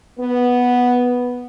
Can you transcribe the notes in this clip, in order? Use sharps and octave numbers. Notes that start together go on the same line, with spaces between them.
B3